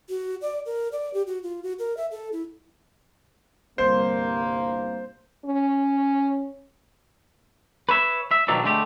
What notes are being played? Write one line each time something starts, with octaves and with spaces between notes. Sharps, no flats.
F#4
D5
A#4
D5
G4
F#4
F4
F#4
A#4
E5
A4
E4
G1 C2 A#3 C5
C#4
B4 C#5 E5
E5
B2 D#3 F3 F#3 D4 A4
D3 G#3 A3 G4